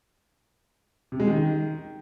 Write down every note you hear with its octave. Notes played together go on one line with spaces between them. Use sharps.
C3
G#3
D#3